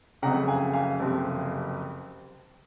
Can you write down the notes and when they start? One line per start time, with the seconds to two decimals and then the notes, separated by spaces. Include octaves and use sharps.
0.22 F#1 F2 C#3 F#5 A#5
0.48 F5 G#5
0.74 F5 G#5
1.00 F#1 F2 C3